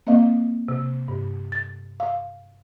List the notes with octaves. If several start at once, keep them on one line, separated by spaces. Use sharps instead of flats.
A#3 C4 C5 D#5 F5
C3
G2
A6
F5